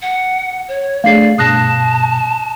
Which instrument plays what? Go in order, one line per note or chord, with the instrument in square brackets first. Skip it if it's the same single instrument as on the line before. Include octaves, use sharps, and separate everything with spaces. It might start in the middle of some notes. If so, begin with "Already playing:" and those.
[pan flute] F#5
C#5
[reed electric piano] A3 D4 G#4 [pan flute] D5 [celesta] F5 C7
[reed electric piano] G2 B2 [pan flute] A5 [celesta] D#6 F#6 A#6